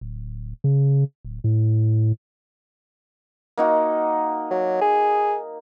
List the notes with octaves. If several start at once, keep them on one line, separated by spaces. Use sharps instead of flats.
D1
C#3
D1
A2
A#3 D#4 F#4
F#3
G#4